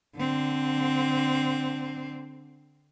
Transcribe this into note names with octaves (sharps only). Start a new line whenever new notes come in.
D3 C4